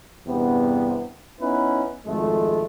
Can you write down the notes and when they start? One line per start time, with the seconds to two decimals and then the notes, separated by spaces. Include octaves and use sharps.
0.27 E2 G2 C3 B3
1.40 B3 C#4 D#4 E4 B4
2.05 G#1 F2 G#3 A3